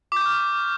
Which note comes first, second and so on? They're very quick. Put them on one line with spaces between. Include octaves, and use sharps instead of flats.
D6 G6 C#6 F6